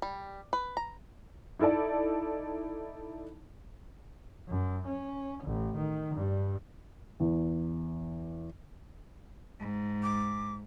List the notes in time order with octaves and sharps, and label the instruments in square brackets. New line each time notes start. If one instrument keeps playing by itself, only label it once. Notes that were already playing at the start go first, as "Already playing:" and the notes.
[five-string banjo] G3
B4
A#5
[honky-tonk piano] D#4 E4 A4 D5 A5
[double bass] F#2
C#4
A1
D#3
G2
[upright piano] E2
[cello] G#2
[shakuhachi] D6